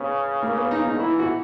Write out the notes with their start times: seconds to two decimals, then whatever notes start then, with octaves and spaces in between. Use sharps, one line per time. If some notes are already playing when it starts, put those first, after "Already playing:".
Already playing: C#3 B3 C#4
0.43 A#3
0.57 B3
0.71 D#4
0.85 D#4
1.00 E3 E4
1.19 F#4